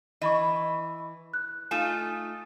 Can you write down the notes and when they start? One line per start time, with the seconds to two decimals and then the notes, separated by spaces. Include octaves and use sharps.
0.22 E3 D#5 B5 C#6
1.34 F#6
1.71 A3 D#4 F4 G#5 E7